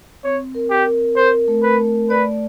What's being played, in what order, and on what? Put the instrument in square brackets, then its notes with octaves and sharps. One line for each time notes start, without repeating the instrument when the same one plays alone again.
[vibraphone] C4 [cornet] C#5
[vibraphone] A#4
[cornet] G4
[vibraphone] A#4
[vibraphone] A#4 [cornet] C5
[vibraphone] A3
[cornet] B4
[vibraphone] A3
[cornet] B4 [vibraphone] D5